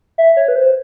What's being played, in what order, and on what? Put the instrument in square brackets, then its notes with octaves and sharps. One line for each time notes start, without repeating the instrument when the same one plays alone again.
[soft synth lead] E5
C#5
B4
C5